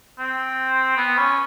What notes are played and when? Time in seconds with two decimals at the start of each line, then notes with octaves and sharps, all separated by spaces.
0.19 C4
0.97 B3
1.18 C#4